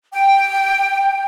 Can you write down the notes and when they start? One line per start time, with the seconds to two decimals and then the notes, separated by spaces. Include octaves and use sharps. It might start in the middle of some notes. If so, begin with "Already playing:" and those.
0.13 G5